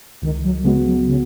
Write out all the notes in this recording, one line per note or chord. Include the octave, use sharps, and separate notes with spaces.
C#2 D#3
F#3
C#3 G#3 B3 F#4
F#3
C#3